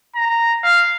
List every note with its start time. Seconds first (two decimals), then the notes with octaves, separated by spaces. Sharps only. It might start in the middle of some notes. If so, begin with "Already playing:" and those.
0.16 A#5
0.63 F5